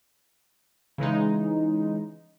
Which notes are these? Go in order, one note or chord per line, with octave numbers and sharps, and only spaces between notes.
C#3 E3 G#3 D#4